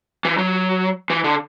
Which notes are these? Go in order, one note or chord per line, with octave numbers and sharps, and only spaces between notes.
E3
F#3
E3
D3